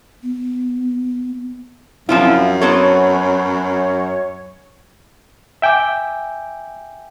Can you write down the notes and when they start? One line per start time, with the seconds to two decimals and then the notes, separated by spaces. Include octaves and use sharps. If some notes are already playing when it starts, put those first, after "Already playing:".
0.23 B3
2.09 F#2 F3 C4 E4 F4
2.61 B3 C4 A4 C#5
5.62 E5 G5 G#5 D6